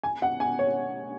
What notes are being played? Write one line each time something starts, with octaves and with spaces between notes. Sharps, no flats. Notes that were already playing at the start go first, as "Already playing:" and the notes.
G#5
F#5
G#5
C#5